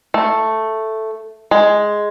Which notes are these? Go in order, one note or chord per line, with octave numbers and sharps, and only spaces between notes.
A3
G#3